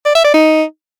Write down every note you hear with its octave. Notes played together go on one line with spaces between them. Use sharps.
D5
E5
D5
D#4